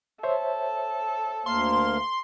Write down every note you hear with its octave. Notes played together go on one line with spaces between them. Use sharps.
A4 C5 C#5 E5
D2 A#3 F5 C6